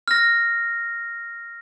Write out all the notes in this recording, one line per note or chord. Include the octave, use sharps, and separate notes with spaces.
F6 A#6